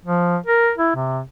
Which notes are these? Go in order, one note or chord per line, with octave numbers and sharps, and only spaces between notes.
F3
A#4
E4
C3